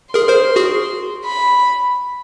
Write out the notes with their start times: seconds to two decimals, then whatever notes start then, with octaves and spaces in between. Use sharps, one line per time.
0.14 G#4 A#4 C6
0.29 A#4 C5
0.56 F#4 G#4
1.25 B5